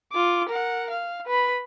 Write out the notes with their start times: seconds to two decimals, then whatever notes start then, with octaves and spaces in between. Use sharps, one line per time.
0.12 F4 D6
0.48 A#4 F#5
0.90 F5
1.26 B4 B5